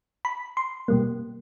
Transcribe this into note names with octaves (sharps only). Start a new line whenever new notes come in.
B5
C6
B2 G3 A#3